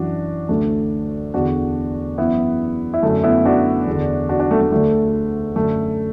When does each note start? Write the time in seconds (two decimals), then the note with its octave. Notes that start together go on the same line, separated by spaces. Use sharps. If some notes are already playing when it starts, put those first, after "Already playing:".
Already playing: F#2 E3 D4 F#4
0.49 D2 D3 A3 D4
1.34 E2 D3 D4 F#4
2.18 F#2 E3 B3 E4
2.94 E4
3.02 F#2 D3 A3 D4
3.24 B3 E4
3.45 D4 F#4
3.87 E2 D3
4.29 D4 F#4
4.40 D4 F#4
4.51 A3
4.61 A3
4.71 D2 D3 A3
5.55 F#2 D3 A3